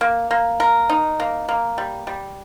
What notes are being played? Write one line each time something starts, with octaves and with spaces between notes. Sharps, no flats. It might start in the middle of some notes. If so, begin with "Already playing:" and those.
A#3
A#3
A#4
D#4
A#3
A#3
G3
G3